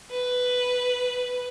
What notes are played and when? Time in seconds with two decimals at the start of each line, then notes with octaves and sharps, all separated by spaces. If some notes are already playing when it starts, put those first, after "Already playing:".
0.10 B4